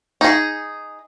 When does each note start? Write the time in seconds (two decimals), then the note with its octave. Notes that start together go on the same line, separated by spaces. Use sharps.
0.21 D#4 G#4